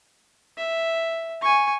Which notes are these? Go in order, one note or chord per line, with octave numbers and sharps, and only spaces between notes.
E5
G#5 C#6